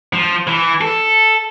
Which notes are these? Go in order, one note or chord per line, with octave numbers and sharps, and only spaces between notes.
F3
E3
A4